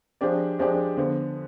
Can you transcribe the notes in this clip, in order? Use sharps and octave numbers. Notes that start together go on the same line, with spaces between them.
F3 G#3 D4 G4 D5
F3 G#3 D4 G4 D5
D3 F3 B3